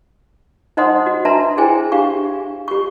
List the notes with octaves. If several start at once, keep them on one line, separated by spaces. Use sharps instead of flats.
D#4 C5 D#5 F#5 C6 D#6
F#4
D4 B4 E5 A5 A#5 C6
E4 G#4 C5 G5 G#5
D4 G4 F5 C#6
G4 C#6